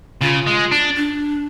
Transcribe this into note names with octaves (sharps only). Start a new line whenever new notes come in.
C#3 F4
G#3
D4
D4